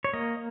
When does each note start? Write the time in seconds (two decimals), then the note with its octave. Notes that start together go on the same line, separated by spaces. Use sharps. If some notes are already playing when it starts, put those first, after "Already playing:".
0.04 C#5
0.13 A#3 D#5